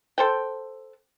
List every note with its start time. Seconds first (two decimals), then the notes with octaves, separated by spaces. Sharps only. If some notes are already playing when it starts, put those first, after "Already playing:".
0.18 A4 C5 G5